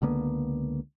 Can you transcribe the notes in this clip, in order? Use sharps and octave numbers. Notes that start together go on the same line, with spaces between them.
C#2 D3 A#3 B3